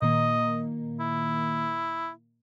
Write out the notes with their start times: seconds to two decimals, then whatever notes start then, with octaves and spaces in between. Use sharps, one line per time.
0.02 A#2 D#3 A#3 D#5
1.00 E4